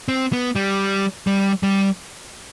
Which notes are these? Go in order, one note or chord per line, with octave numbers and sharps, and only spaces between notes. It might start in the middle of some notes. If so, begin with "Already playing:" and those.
C4
B3
G3
G3
G3